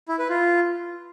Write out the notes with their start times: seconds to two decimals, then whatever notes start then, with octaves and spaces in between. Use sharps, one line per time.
0.08 E4
0.19 B4
0.29 F4